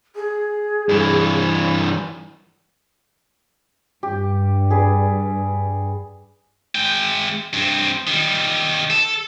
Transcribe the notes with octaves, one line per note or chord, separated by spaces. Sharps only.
G#4
G2 E3
G2 G4
G#4 B4 D5
G#3 G5
G2 C4
D#3 G3
A4